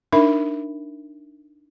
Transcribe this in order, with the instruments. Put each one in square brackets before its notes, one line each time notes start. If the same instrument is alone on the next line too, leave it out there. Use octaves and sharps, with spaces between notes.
[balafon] D4 D#4 A#4 E5 B5